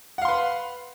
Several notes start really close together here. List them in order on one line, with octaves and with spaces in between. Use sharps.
F#5 F5 C6 B4